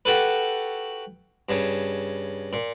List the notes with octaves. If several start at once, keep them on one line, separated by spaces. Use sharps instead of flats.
F#4 G4 A4 B4
G2 C#3
A#2